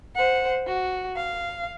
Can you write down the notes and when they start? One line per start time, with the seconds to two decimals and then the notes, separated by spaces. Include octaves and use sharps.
0.16 C5 F#5
0.67 F#4
1.16 F5